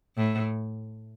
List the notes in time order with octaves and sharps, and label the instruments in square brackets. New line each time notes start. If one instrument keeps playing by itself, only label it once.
[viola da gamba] A2